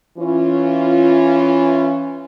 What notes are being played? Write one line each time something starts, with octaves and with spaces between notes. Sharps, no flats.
E3 C#4 F4